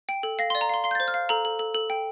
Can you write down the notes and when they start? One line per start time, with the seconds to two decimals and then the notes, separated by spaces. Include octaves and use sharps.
0.09 G5
0.23 A4
0.39 F5 A#6
0.50 D5 C6
0.61 A#5
0.69 F5 C6
0.84 F5 C6
0.91 G6
0.95 C5 A6
1.08 F6
1.14 F5
1.29 A4 A#5
1.45 A4
1.59 A4
1.75 A4
1.90 G5